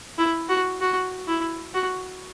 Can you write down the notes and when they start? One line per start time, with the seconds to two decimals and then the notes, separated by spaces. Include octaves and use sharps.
0.18 E4
0.49 F#4
0.81 F#4
1.27 E4
1.74 F#4